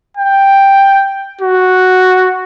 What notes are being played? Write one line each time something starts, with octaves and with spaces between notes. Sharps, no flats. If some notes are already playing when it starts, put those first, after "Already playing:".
G5
F#4